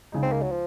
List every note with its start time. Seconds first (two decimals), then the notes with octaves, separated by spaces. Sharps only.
0.12 C#2 C#3 G#3 D#4
0.23 C4
0.32 A#3
0.42 F#3
0.51 F3